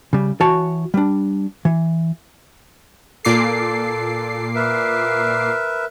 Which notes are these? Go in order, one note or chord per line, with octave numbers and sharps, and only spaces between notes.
C#3 G3
E3 F#4 C#5 A5
G3 D4
E3
A#2 A4 D6 C7
A#4 B4 E5